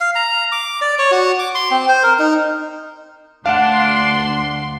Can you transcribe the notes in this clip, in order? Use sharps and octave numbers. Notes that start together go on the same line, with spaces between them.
F5
A#5
D6
D5
C#5
F#4
D6
C6
C4
C5
A#4
D#4
D2 D4 F5 F#5 C6